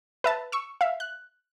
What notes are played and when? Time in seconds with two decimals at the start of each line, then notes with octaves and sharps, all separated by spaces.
0.24 B4 E5 A5
0.52 C#6 E6
0.81 E5 F5
1.00 F#6